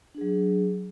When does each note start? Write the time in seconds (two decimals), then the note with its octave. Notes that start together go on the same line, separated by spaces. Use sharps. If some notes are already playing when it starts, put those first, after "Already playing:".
0.14 D4
0.18 G#4
0.21 F#3